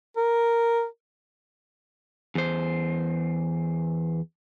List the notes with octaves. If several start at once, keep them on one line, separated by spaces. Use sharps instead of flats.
A#4
E2 C5